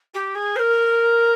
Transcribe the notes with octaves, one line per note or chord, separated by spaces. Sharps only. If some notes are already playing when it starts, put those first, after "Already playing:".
G4
G#4
C5
A#4